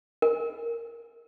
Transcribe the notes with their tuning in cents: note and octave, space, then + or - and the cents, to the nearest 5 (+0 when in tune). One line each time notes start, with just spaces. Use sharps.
A#4 -5